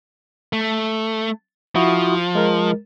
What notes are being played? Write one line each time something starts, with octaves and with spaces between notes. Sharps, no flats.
A3
F3 E4 F#4 D#6
G#3 A#4